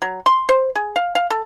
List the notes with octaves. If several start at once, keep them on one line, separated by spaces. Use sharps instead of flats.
F#3
C6
C5
G#4
F5
F5
A4